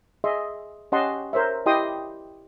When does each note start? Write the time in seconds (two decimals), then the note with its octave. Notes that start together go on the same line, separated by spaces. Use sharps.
0.24 G#4 D#5 E5 C6
0.92 C#4 G4 D#5 F#5 A5 C6
1.33 A#4 C5 C#5 E5
1.66 E4 G4 D#5 G5 C6 D#6